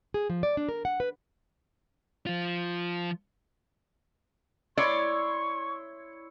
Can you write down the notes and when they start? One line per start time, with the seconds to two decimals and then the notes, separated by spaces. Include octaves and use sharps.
0.14 G#4
0.30 F3
0.43 D5
0.57 D4
0.69 A#4
0.85 F#5
1.00 B4
2.27 F3 F4
4.77 E4 C#5 D5 C6 C#6